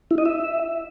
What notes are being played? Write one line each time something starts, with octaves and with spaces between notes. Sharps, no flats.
E4
D#5
E5